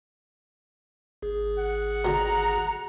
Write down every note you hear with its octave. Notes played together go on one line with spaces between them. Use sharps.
G#1 G#4
F#5
B2 D3 A#5